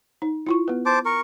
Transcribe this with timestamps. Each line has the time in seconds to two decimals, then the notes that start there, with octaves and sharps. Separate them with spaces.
0.22 D#4
0.46 E4 F4 C#6
0.68 B3 B4
0.86 C5 A5 D6
1.05 A#4 C#6